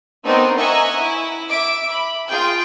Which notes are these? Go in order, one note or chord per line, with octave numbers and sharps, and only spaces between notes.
A3 B3 C4 D4 D#4 A#4
D#5 E5 F#5 G#5 A#5 C#6
E4
E5 D6 D7
B5
F4 G#4 G5 G6